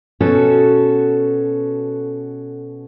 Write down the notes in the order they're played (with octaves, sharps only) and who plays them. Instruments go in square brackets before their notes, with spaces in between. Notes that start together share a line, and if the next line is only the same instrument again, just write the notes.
[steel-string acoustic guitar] B2 C#4 F#4 A4